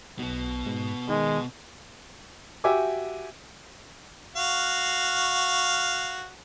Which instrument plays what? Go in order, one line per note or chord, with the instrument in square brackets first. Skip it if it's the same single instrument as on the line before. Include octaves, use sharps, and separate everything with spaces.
[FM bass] B1 [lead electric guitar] B2 B3
[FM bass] G#2
[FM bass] D#3 [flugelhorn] G#3
[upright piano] F#4 G4 E5 G5 G#5 D6
[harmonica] F#4 F5